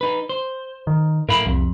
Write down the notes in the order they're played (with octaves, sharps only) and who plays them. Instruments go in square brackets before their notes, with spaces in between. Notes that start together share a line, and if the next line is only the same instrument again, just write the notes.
[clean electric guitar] D#4 B4
C5
[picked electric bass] D#3
[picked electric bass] A2 [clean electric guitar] A#4 F5 B5
[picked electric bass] C2 [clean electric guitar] F2